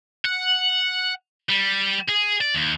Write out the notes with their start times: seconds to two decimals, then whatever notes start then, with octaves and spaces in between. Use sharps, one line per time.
0.25 F#5
1.49 G3
2.08 G#4
2.41 D5
2.54 D#2